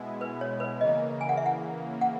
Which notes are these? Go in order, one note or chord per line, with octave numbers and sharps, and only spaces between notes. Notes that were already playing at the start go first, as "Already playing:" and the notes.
Already playing: B2 G#3 B3 E4
B4
C#5
B4
C#3 E3 A#3 D#5
G#5
F#5
E5
F#5
F#5